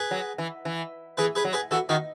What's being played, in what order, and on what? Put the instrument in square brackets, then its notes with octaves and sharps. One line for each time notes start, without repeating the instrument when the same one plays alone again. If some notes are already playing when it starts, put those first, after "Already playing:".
Already playing: [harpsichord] G#4 B4
[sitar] F#3
E3
E3
[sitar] E3 [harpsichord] G#4 B4
[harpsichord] G#4 B4
[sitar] F#3
[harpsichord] G#4 B4
[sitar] E3 [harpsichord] F#4 A4
[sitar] D#3 [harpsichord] D#4 F#4